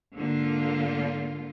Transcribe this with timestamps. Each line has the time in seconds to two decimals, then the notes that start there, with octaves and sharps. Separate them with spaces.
0.18 G#2 D3 A#3 F4